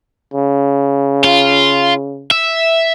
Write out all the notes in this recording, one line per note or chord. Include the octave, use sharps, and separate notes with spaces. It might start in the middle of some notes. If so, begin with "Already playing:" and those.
C#3
F4
E5